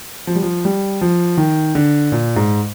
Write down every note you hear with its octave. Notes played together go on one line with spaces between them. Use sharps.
F3
G3
F3
G3
F3
D#3
D3
A#2
G#2